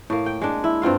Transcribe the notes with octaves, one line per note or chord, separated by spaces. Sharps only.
A2 A#3
G5
G#3 D4
E4
G2 C4 F4 F5